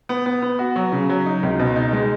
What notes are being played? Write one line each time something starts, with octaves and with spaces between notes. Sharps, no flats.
B3
B3
B3
F#4
F#3
C#3
F#3
D#4
C#2
B2
D#4
G#3